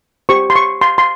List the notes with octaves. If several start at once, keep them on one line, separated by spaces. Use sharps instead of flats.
G4 C5 C#6
C6
C#6
C6
C6